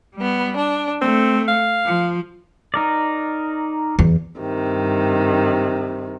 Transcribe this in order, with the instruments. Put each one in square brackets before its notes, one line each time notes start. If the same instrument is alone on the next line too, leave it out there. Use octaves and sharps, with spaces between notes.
[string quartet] G3 B3
D4
[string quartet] A3 [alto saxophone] C4
[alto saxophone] F5
[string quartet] F3
[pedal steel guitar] D#4 A#4 D5
[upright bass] E2
[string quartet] G2 C3 D#3